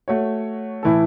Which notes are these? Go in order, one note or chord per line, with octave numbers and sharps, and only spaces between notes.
A3 F#4 C#5
A2 E3 A3 E4 A4